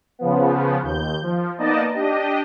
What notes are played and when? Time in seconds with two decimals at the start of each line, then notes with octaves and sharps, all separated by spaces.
0.19 C#3 F3 B3
0.83 D#2 G6
1.22 F3
1.58 A#3 B3 D#4 D5 D#5 A5
1.93 D4 G4 D#5